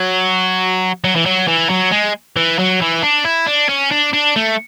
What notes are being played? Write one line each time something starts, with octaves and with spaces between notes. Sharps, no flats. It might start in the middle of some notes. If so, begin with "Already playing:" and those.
Already playing: F#3
F#3
E3
F#3
E3
F#3
G#3
E3
F#3
E3
D4
E4
D4
C#4
D4
D4
A3